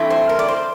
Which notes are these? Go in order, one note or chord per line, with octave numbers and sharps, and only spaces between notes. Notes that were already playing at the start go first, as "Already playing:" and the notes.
Already playing: G2 E3 A3 C4 E4
C5
A#4
D5
C5